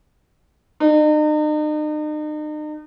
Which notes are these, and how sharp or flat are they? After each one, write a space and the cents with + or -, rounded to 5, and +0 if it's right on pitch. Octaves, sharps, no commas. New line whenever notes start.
D#4 -40